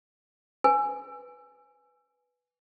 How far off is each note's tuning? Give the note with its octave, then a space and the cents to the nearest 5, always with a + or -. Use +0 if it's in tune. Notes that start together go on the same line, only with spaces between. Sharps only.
B4 +0 G#5 +0